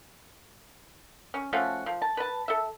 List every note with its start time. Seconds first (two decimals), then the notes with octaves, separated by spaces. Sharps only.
1.34 C#4
1.53 F3 A3 C#4 F#4
1.86 F3
2.02 A5
2.17 B4 A5
2.48 A4 E5